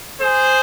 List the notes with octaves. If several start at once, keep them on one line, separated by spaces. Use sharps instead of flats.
G#4 C5